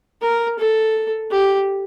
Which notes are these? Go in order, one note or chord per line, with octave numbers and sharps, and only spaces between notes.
A#4
A4
G4